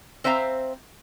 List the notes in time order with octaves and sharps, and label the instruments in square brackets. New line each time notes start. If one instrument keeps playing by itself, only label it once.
[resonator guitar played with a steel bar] C4 C5 E5 F5 A5 A#5